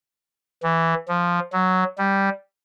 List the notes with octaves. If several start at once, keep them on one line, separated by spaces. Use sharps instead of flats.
E3
F3
F#3
G3